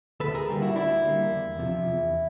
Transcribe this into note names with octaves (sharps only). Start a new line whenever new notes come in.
D2 A4 B4
G#4 A#4
D3 G3 A#3
E4 F#4
D2 D4 E4
D3 G3 A#3
E2
C3 F3
E2